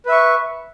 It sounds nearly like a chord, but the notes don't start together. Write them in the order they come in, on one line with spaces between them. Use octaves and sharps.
B4 E5 C#6